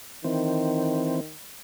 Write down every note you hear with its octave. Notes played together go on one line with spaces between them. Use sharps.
D#3 E3 C4